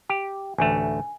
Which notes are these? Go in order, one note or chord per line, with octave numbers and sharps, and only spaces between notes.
G4
A1 D2 A3 G#5